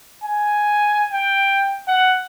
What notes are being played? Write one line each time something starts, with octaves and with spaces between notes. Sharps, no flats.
G#5
G5
F#5